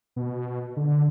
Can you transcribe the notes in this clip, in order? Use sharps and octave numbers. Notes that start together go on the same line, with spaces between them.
B2
D3